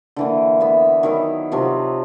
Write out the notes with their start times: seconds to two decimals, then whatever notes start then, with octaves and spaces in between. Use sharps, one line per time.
0.16 D3 E3 A#3
0.61 B3 E5
1.03 D#3 F#3 E4
1.52 C3 F3 F#3